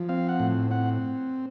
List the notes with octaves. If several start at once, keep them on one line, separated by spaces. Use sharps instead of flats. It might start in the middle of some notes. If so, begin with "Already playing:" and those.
Already playing: F3
C4 F5
F#5
A2
C4 F#5